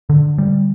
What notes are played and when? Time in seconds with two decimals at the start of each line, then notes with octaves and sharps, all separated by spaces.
0.10 D3
0.38 G3